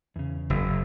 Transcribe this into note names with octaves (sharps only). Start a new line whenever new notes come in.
E2 C#3
F#1